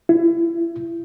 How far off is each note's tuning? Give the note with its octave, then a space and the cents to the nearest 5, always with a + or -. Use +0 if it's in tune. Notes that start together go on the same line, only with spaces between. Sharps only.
E4 +30